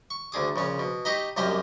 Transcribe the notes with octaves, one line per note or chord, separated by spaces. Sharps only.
C#6
D2 D3 G#4 D6
A#1 C#3 C#4
B2
D#4 G4 D#5 B5 C#6
C2 F#2 A#3 G4 D#5 G#5